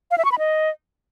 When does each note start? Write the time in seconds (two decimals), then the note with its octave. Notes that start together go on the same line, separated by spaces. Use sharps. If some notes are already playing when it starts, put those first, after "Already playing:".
0.11 F5
0.18 E5
0.25 C#6
0.32 B5
0.39 D#5